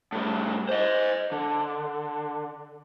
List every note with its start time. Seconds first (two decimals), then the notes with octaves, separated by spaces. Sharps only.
0.12 A2 G3
0.69 C5 D#5
1.32 D3